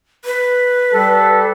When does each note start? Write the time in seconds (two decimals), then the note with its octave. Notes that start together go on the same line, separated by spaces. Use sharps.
0.25 B4
0.93 G3 A4